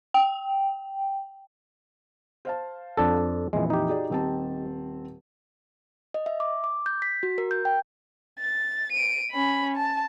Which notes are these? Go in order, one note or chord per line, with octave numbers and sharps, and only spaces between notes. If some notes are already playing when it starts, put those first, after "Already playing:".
G5
C5 F5 A5
F2 D4 A4
F2 A#2 E3 G#3
D#4 G4
F#4 G#4 D5
D#1 C4 A5
D#5
E5
D6
D6
G6
B6
F#4
A#4
G6
G5
A6
D7 D#7
C#4 B5
A5